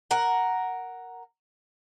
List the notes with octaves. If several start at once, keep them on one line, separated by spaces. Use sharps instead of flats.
A#4 F#5